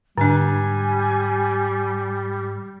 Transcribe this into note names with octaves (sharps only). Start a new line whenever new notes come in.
G#2 D3 G3 D4 G#5 F#6